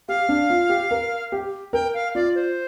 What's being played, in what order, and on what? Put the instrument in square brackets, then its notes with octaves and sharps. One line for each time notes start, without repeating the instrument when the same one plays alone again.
[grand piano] G4 [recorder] F5
[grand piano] D4
F4
G4
A#4
G4
[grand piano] A#4 [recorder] G5
[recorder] F5
[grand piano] F4 [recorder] D5
[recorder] C5